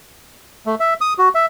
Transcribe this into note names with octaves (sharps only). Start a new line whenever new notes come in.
A3
E5
D#6
F#4
E5